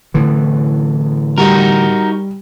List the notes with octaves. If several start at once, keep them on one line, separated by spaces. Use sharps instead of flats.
A2 D3 E3
G3 D#4 F#4 A#4